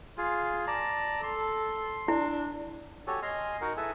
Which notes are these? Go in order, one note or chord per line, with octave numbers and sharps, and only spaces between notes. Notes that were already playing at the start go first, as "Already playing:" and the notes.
F4 G#4
D5 A5 A#5
A4 C6
D4 E4
F#4 G4 A4 C#5 G#5
D#5 G#5 C6 F6
D#4 F#4 A#4 F#5
E4 G#4 A4 B4 E5 G#5